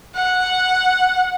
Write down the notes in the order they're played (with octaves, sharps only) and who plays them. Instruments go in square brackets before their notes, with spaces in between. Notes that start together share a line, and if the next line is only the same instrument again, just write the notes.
[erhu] F#5